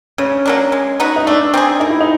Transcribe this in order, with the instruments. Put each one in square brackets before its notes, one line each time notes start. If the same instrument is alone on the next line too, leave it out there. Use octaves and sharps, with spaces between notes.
[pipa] C#3 [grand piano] C#4
[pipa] F#3 A#3 D4
G#3
B3 D#4 F#4
[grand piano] D#4
[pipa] A3 [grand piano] D4
[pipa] C4 D#4 G#4
[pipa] A#3 [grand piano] D#4
[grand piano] E4
D#4